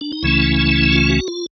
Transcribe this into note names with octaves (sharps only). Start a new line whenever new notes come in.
D4
D#4
C#2 C#3 E3 A3 C#4 E4
F4
F#4
F4